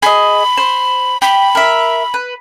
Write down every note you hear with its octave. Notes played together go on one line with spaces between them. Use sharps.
G#4 D#5 B5
C5
G4 B5
A#4 E5
B4